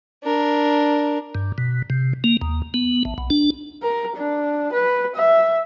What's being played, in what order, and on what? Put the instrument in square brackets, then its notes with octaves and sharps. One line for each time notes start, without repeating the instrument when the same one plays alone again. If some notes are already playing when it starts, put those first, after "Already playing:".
[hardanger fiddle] D4 A#4
[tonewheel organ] G2
B2
C3
A#3
D#2
B3
A1
B1
D4
[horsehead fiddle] A#4
D4
B4
E5